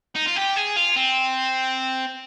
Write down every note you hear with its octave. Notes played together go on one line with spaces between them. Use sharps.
D#4
F4
G4
G#4
F4
C4